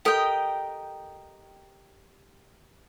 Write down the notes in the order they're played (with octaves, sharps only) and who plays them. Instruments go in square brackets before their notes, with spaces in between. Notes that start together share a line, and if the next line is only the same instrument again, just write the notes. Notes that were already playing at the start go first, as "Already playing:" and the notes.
[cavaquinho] G4 A#4 D#5 G5 [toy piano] A4